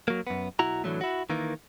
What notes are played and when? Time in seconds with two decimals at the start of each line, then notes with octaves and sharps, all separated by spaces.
0.08 F#3 A#3
0.27 F#2 B3
0.59 B1 E4 F#4 A#5
0.84 A2 D3 E3 F#3 A3
1.01 E4 F#4
1.30 D#3 E3 A#3